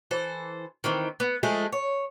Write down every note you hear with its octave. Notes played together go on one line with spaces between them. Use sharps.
E3 A4 C5
D#3 E3 C4
B3
F3 G#3 A3 G#4
C#5